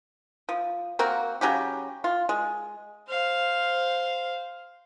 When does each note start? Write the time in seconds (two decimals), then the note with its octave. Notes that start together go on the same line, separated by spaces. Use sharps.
0.49 F3
0.99 A#3 C4 F#4
1.41 C#3 F#3 C#4 G4
2.04 F4
2.29 G#3
3.07 C5 F5